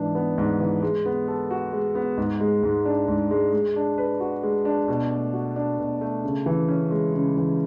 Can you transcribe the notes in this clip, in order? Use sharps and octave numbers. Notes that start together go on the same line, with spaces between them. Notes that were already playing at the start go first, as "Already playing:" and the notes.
Already playing: G#2 E3 D4
B3
G#2
E3
G#3
B3
A4
F#4
G#3
B3
G#2
G#3
G#2
D4
G#2
G#3
G#3
D4
B4
F#4
G#3
D4
B2
A3
F#4
D4
B2
A3
C#3
E3
C#4
G#3
C#3
E3